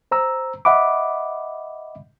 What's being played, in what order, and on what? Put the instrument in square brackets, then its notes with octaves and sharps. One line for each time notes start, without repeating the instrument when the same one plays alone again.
[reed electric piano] C5 A#5 E6
D#5 E5 F#5 B5 D6